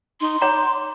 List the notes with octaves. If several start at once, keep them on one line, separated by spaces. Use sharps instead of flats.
D#4 C6
C#5 A#5 D6